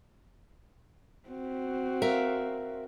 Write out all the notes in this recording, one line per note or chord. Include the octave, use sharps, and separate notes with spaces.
C4 F#4
A#4 E5 F5